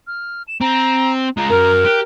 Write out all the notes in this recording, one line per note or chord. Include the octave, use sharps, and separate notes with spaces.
F6
E7
C4 A#5
G#3 F4 A#5
F#2 F#3 A#4
G4 F#6